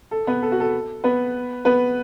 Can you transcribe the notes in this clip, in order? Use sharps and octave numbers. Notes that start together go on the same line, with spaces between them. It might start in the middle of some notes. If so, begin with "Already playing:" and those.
A4
B3 B4
A4
F#4
A4
B3 B4
B3 B4